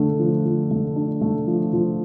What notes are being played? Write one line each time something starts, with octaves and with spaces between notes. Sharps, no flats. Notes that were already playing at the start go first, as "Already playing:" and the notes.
Already playing: D3 A3 D4
F3
F3
A3
D4
A3
F3
F3